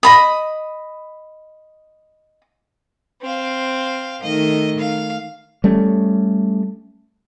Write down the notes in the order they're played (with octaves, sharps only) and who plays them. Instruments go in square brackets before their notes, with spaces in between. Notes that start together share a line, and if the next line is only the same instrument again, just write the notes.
[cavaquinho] D#5 B5 D#6
[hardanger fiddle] C4 F5
[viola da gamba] D#3 A3 [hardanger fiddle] D#5
[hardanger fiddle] F5
[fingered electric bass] G3 A3 C#4